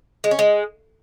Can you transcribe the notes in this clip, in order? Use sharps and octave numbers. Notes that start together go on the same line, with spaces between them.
G#3
C#4
G#3